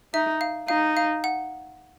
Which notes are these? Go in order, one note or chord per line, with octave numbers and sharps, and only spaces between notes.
D#4 E5
F5
D#4 F5
F5
F#5